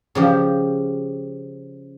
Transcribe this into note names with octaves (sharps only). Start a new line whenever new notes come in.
C#3 F3 G4